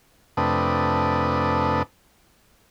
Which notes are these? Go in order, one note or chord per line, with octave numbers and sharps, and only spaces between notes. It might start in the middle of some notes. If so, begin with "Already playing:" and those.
F2 C3 A3 D4 B4 D#6